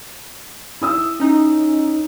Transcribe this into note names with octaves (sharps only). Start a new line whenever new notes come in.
E4 D#6 E6
C#4 D#4